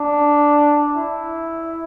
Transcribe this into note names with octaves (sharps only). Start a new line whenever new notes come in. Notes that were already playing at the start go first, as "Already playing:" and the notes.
Already playing: D4
E4